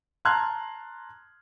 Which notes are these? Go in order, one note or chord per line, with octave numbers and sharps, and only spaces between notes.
A5 A#5 C6 F6 F#6 G#6